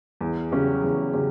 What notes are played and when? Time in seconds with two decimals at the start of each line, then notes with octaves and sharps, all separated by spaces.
0.21 E2
0.51 C#3 F#3 C#4 G4
0.83 E2
1.13 C#3 F#3 C#4 G4